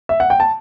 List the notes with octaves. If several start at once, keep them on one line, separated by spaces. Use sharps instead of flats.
E5
F#5
G5
A5